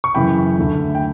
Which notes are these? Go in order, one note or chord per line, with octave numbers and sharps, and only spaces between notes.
C#6
F#2 C#3 E3 G5 B5
D2 D3 A3
G5